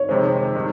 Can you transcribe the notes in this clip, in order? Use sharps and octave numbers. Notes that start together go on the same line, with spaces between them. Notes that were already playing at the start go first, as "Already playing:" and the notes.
Already playing: C#5
F2 C3 D#3 G#3 C5
C3 D#3 G3